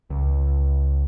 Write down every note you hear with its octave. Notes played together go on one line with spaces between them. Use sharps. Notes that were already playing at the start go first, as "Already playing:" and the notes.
C#2